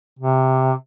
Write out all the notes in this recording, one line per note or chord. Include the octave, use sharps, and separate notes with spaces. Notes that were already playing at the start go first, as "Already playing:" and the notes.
C3